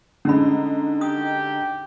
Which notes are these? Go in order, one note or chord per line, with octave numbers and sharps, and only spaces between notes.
D3 G#3 C#4 D#4 B5
G4 D#6